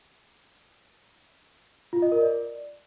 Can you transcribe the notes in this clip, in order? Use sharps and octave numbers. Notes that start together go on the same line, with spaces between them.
F4
D#5
A#4
D5